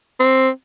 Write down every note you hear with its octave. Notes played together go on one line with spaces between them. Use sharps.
C4